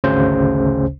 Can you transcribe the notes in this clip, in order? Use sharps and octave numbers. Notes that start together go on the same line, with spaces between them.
G#1 D2 C#3 C#4 C5